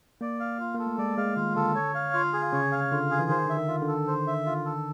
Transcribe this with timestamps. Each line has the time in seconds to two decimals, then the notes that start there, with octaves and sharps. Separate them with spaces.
0.21 A#3 D5
0.40 F5
0.60 F4
0.75 A#3 A4
0.86 A3
0.98 G#3 D5
1.17 G#3 F5
1.36 D#3 F4
1.56 D3 A4
1.75 C#5
1.95 F5
2.13 F4
2.33 G#4
2.52 C#3 C#5
2.72 F5
2.91 D3 F4
3.10 G#4
3.19 E3
3.30 D#3 C5
3.45 D3 E5
3.56 D#3
3.68 F4
3.81 D3
3.87 A4
4.07 C5
4.27 E5
4.46 F4
4.65 A4